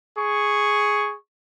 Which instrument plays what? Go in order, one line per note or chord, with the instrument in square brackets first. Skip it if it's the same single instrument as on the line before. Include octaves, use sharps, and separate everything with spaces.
[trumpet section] G#4 C#6